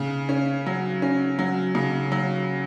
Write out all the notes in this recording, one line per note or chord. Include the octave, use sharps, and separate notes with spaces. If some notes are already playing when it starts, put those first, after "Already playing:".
Already playing: C#3
C#4
F#3
C#4
F#3
C#3
F#3